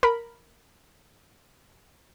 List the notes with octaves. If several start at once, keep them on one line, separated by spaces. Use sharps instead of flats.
A#4 B5